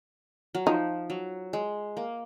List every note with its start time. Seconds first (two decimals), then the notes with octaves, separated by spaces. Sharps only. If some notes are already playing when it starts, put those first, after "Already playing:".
0.55 F#3
0.66 F3 D#4
1.10 F#3
1.53 G#3
1.97 A#3